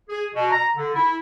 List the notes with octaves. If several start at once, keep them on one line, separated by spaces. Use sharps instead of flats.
G#4
B2
A#5
D3
E4